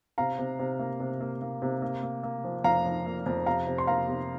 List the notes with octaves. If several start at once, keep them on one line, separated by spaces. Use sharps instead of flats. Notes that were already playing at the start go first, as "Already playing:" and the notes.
C3 F5 A#5
C3
C3
A#3
C3
A#3
A#3
C3
A#3
A#3
A#3
F3
F2 F5 A#5
F3
A#3
F2
C3 F5 A#5
C3
C6
A#3 F5 A#5
C3